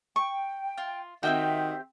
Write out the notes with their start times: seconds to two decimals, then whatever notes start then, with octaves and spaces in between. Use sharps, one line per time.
0.16 G5 C#6
0.78 F4
1.23 D#3 C4 F#4 G4 E5 G5